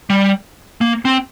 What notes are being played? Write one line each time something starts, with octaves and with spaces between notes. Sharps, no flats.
G3
A#3
C4